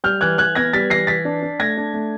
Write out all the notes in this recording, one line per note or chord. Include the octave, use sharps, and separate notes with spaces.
G3 F6 G6
E3 F#6 G#6
E3 F#6 G#6
B3 G#6 A#6
G3 A6 B6
E3 A#6 C7
E3 A6 B6
D4
D4
A3 G#6 A#6
D4
A3